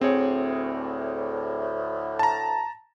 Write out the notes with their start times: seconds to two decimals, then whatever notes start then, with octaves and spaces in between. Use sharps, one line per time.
0.01 D2 A2 C4 G#4 C#5
2.19 A5 A#5